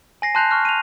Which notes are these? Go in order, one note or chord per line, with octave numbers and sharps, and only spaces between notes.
G#5 A#6 C7
A5 C6 F#6 G6 C7 F7
C#6 F6 F#6
D#7 F7